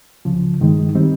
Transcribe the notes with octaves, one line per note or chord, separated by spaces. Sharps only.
C#2 C#3 F3
G2 D#3 G#3 D#4
D#3 G3 C4 D#4